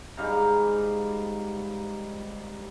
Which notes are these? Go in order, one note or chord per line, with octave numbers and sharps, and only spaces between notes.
G#2 G3 F5 A#5